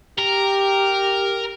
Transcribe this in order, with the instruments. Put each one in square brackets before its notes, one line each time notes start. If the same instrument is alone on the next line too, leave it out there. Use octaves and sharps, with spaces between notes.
[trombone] G4 [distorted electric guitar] A#4